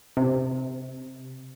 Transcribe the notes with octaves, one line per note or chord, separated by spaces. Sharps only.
C3